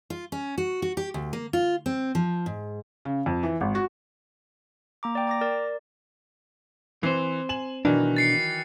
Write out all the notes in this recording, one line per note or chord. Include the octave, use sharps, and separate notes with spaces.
F4
C#4
F#4
F#4
G4
D2
A#3
F4
C4
F3
G#2
C#3
F2
E3
G#1
F#4
A#3 A#5 D6
D5 G5
A#5 D6 A#6
A#4 D5
E3 C4 C5 C7
G#5 E7 F#7
B2 D#3 E3 F#3 D4
A6 C7 C#7